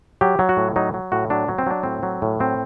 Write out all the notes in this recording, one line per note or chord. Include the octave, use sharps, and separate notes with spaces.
F#3 G4
F#3
F#4
A2
F#3 D#4
F#3
A2 F#4
F#3 D4
F#3
C4
F#3 D4
A2 C4
F#3
A2
F#3 C4